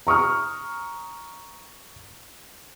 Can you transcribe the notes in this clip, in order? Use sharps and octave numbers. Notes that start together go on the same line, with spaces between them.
A#5 C#6 D#6 F6